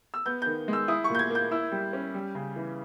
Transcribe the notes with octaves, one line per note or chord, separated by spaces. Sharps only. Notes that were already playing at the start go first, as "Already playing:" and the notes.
E6
B3 G6
G6
D#3
G#3
E6
E4 D#6
C#6
A#2 G6
G#6
A#3
G6
E4 E6
G3
C#4
G3
C#3
E3